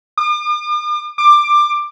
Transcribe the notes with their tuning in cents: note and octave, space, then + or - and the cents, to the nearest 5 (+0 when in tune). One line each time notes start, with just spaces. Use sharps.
D6 +45
D6 +15